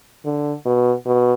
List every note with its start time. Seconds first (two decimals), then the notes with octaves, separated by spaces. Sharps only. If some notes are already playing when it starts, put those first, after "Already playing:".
0.25 D3
0.65 B2
1.06 B2